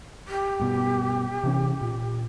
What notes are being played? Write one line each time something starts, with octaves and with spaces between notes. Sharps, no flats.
G4
G2 B2
C3 E3 C#4
A#2